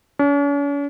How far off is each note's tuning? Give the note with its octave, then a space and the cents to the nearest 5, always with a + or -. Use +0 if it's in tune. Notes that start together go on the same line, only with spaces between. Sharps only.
C#4 +45